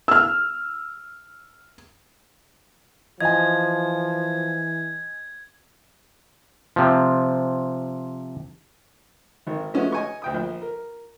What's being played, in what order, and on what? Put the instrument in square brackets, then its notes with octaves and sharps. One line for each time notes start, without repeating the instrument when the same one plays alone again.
[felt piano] E6 F6
[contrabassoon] E3 [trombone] F3 [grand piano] D#5 G#5 [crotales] G#6
[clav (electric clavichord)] C3 F3
[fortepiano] G#1 A#4
F3 G#3 A3 B3 C#4 F#4
D#5 G#5 C#6
D2 G5 D#6
A#1
A#4